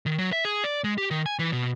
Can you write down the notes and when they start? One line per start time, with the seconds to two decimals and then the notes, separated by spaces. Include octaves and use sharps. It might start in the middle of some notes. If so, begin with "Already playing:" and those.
0.06 D#3
0.19 F#3
0.33 E5
0.45 G#4
0.64 D5
0.84 G#3
0.98 G4
1.11 D#3
1.26 G#5
1.39 E3
1.52 B2